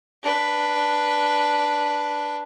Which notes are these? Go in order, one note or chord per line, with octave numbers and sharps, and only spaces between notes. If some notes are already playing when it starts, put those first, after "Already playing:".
D4 B4